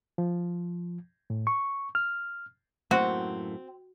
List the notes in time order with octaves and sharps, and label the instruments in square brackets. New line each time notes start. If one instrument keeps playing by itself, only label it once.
[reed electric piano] F3
A2
C#6
F6
[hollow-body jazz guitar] F#2 A2 A#3 [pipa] C4 [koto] F#4